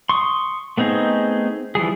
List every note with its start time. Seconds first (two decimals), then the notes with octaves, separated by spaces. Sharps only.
0.09 C6 C#6 D#6
0.77 A3 B3 C4 D#4 G#4
1.75 E3 F3 G3 G#4